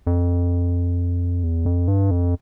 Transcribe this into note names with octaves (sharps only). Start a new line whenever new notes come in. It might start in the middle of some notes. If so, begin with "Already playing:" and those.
F2
E2
F2
G2
F2